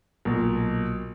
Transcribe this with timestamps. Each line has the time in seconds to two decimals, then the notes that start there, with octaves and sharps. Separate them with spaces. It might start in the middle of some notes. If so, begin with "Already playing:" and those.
0.25 B1 A#2